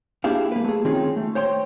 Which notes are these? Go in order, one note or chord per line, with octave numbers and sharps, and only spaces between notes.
A#3 D4 E4 G4 G#4 F5
A#3 B4
A3 G#4
D#3 C4 C#4 D#4 F4 G#4
A3
C5 C#5 G5 C6